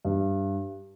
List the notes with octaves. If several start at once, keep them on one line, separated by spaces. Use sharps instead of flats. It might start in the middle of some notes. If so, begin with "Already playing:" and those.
G2